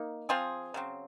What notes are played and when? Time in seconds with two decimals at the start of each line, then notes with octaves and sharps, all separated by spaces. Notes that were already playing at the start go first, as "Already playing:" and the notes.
Already playing: A#3 D#4
0.29 F3 C4 F4 G#4
0.74 C#3 F#3 C4